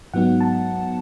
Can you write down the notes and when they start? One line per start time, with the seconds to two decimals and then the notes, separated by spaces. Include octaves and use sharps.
0.13 G#2 F#3 B3 D#4 F#5
0.41 A5